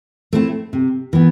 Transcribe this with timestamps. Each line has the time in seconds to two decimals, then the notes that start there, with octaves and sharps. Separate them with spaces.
0.33 A3 C4 E4
0.73 C3
1.13 E3 B3